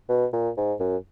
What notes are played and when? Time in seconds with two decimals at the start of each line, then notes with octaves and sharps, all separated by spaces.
0.09 B2
0.33 A#2
0.57 G#2
0.80 F#2